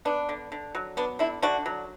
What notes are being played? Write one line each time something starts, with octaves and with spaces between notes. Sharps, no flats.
B3 D4
D3
D3
F#3
B3 D4
D3 E4
D3 D4 F#4
F#3